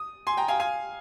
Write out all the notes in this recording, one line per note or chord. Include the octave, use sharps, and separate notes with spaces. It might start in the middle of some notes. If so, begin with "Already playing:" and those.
Already playing: D#6
G#5 C6
G5 A#5
F5 G#5
F5 G#5